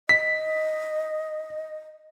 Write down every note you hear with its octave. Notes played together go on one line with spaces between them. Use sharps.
D#5 B6